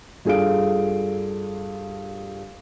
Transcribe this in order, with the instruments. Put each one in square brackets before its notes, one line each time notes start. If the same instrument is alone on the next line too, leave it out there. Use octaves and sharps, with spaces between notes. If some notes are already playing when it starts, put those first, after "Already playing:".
[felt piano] G2 F4 G#4 A4 F5 D7